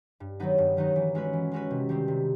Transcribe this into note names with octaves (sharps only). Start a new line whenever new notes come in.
G2
D#3 F#3 B3 D#4
G2
D#3 F#3 B3 D#4
E3
G#3 C#4 F#4 B4
E3
G#3 C#4 F#4 B4
C3
D#3 G3 C4
C3